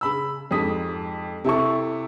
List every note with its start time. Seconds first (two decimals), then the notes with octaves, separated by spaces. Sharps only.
0.01 C#3 B5 E6
0.51 F2 G#2 G4 D#6 B6
1.44 C3 E4 A4 C#6